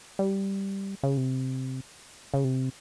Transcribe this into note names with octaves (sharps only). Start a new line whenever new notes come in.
G3
C#3
C3
C#3
C3